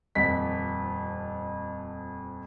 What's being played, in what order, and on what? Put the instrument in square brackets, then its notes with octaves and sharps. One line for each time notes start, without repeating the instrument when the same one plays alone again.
[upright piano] D#1 F2 B6